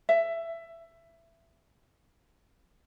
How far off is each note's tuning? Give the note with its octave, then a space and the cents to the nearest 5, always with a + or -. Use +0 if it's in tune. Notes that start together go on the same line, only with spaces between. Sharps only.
E5 +15